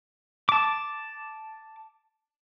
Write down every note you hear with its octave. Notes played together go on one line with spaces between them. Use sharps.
A5 D6